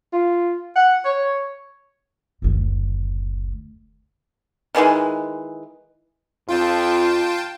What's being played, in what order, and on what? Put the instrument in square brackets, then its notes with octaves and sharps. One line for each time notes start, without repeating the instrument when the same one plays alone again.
[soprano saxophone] F4
F#5
C#5
[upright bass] F#1 D2
[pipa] D#3 E3 G3 G#3
[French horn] F2 [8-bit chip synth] F4 G5 A5